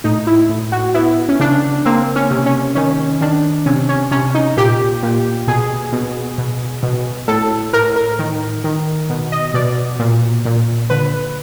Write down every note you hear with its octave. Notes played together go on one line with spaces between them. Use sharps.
A2 D#4
E4
A2
F#4
B3 E4
C#4
C#3 D4
A#3 C4
C#4
C3
C#4
D#3 C#4
D#3 D4
C3 C#4
C#4
C3 C#4
D#4
A#2 G4
A#2
B2 G#4
B2
B2
B2
A2 A4
A2 A#4
A#4
D#3
D#3
B2
D#5
B2 D5
A#2
A#2
D3 B4